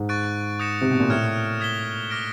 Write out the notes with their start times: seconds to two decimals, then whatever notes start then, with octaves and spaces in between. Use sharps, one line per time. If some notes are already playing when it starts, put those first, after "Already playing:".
Already playing: G#2
0.09 C#6 F#6 A6 D7
0.59 D#6 G6 A#6 C#7 E7
0.81 C3
0.91 B2
1.00 A#2
1.10 A2 F6 G#6 C#7 E7
1.60 D#6 G#6 B6 E7 G7
2.10 D6 F6 A#6 D7